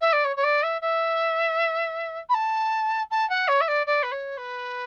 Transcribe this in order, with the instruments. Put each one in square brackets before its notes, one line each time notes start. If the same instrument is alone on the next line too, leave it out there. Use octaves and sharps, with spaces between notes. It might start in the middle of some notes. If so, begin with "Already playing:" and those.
[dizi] E5
D5
C#5
C#5
D5
E5
E5
B5
A5
A5
F#5
C#5
E5
D5
D5
B4
C#5
B4